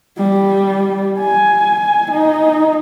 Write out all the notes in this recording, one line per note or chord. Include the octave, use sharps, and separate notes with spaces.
G3
G#5
D#4